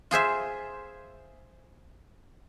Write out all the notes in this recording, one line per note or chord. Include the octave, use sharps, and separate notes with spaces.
F4 G#4 C5 E5